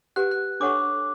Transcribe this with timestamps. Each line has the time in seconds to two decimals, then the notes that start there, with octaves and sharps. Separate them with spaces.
0.16 G4 B4 F#5 F#6
0.31 F#6
0.60 D4 A4 C#5 F#5 C#6 D6